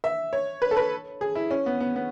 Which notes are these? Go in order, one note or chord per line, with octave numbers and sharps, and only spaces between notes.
E5
C#5
B4
A4
B4
G#4
E4
C#4
B3
B3
B3